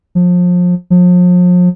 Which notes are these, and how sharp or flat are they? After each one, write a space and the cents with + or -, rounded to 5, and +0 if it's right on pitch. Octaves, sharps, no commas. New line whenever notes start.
F3 +30
F3 +40